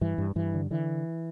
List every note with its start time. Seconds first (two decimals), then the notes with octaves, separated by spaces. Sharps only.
0.01 G2 E3
0.18 G2
0.36 G2 E3
0.54 D3
0.71 D3 E3